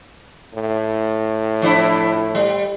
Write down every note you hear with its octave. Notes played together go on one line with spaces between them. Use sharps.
A2
F3 D4 E4
G3